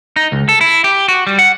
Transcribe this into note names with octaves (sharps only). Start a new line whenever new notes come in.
D#4
C#2
A4
E4
G4
F#4
G3
F#5